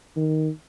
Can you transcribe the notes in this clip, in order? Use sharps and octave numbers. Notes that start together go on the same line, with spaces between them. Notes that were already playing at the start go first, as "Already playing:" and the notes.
D#3